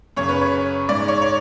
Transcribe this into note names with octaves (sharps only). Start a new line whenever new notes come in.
F#2 C#3 C#5
B4
C#5
G#2 D5
C#5
C#5